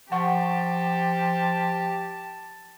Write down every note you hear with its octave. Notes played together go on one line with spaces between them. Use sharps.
F3 G4 F#5 A5 C#6